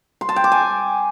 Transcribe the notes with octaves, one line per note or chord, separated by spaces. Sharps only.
C6
A5
G5
D6
G#5